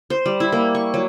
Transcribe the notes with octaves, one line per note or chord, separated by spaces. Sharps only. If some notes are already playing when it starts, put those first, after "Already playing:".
C5
G3
E4
A#3
C#6
F#3